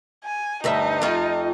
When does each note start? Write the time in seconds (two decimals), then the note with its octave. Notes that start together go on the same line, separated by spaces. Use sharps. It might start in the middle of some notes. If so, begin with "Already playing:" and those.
0.24 G#5
0.64 D2 G2 D#4 E5
1.02 F2 F4